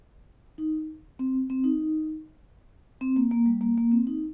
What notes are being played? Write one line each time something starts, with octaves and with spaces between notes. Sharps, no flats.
D#4
C4
C4
D#4
C4
A#3
A#3
G3
A#3
A#3
C4
D#4